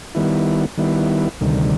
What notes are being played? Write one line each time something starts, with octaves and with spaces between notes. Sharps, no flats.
D#3 G3 B3 E4
D#3 G3 B3 E4
D2 C3 D#3 G3